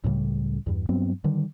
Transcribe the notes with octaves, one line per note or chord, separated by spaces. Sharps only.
C#2 A2 C#3 G3
E2 G2
G2 F#3 B3 C4
D3 D#3 G3